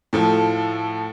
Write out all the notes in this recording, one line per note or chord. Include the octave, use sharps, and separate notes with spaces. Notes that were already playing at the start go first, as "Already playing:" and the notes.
A2 F3 A4